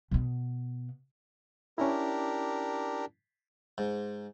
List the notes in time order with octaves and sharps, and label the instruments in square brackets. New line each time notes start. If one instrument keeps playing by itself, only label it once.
[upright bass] B2 B3
[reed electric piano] C#4 E4 [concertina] D4 G4 A#4
[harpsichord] G#2